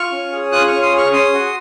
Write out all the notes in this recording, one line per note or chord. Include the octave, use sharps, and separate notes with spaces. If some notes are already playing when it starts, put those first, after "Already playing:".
Already playing: F4 C#6 F6
C#4
G#4
F4 D#6 F#6
C#4 C#6 F6
C6 D#6
G#4 C#6 F6
C#4 C6 D#6
F#4